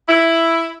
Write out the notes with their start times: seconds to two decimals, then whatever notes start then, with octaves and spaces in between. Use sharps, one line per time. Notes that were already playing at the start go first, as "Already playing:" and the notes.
0.08 E4